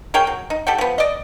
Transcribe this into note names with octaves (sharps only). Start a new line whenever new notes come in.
G#4 A#4 C#5 G5
F#3
D#4
G4 A4 F#5 G5
F3 B3
D5 D#5